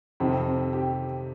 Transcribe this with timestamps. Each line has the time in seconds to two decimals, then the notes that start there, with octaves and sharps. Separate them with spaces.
0.20 F2 C3 D#3 C4
0.73 G4